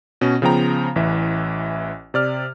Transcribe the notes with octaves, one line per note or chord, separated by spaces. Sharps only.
B2 C#4
C#3 F3 B3 G5 A#5
A1 E3 E5
C3 D5 F6